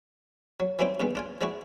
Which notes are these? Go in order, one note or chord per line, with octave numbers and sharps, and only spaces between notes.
F#3
E3 F#3 G3 C4 D#4 E4
G2 B2 D#3 G#3
D4 F4 G#5
F3 G#3 D4 E4 F#4